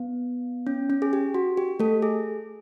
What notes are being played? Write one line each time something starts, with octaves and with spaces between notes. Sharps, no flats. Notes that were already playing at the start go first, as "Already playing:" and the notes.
Already playing: B3
C#4
C#4
G#4
G4
F#4
G4
A3 A4
G#4